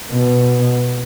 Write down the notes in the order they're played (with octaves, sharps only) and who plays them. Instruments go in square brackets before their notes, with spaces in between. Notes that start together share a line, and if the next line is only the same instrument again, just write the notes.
[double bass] B2